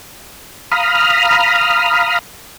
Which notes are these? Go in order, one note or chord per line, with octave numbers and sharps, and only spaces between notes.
F5 A#5 B5 D#6 F6